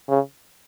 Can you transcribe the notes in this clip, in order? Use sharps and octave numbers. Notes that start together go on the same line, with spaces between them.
C#3